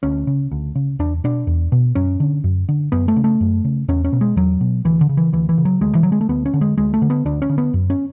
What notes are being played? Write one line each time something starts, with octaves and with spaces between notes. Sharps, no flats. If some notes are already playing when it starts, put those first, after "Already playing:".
D2 C#4
C#3
D2
C#3
E2 D4
B2 D4
E2
B2
F#2 C#4
D3
F#2
D3
F#2 B3
A3
C#3
A3
F#2
C#3
E2 C#4
C#4
B2
G#3
E2 F#3
B2
D2 E3
D3
C#3
E3
D2 E3
E3
C#3
F#3
D2 G#3
E3
D3 F#3
G#3
A3
D2 B3
C#4
D3
G#3
D2 G#3
A3
D3
B3
D2 D4
C#4
D3
B3
F#2
C#4